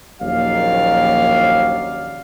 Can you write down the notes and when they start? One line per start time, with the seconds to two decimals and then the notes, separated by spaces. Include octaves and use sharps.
0.21 A#1 D#2 F#3 C#4 D5 F5